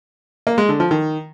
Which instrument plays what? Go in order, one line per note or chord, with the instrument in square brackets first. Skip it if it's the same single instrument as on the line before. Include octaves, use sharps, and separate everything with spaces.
[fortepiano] A#3
G#3
D3
F3
D#3